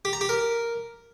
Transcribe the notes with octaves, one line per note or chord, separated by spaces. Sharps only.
G4
A#5
G4
A#4